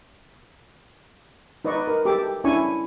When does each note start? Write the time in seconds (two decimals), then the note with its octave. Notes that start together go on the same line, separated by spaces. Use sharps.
1.65 D#4 B4 D5 D#5 C#6
1.87 A#4
2.05 G4 A4 D6
2.44 C#4 D4 E4 G#5 C#6